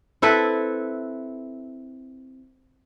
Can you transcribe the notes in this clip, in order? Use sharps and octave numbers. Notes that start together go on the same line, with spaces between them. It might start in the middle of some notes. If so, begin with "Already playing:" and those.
C4 E4 A4 B4